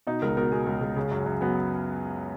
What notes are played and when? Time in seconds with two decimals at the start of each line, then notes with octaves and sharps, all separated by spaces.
0.07 B2 D#4
0.22 C#2 A#4
0.37 B2 A#4
0.52 B2 G#4
0.67 C#2
0.82 C#2
0.96 C#3
1.11 F#2
1.26 F#2
1.41 F#3 B3